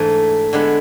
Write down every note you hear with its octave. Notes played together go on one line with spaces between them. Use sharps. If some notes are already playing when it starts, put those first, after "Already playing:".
Already playing: G#2 E3 A3 D4
D3 G#3 B3 E4